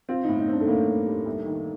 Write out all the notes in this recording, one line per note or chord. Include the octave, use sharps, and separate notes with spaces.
C4 F4
A2 D#4
D#4
C4
D4
A3
A2 A#3
C4
G3
C2
D#3